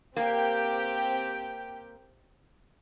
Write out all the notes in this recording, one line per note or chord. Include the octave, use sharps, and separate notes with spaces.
A#3 C4 G4 G5